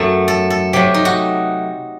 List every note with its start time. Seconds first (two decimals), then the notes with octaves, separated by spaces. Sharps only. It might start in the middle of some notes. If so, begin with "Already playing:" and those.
Already playing: F#2 F#3 A3 A4
0.28 A4
0.50 A4
0.73 C3 F#3 A3 G4
0.94 D#4
1.05 F#4